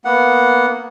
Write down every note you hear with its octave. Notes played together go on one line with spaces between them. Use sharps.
A#3 B3 F#5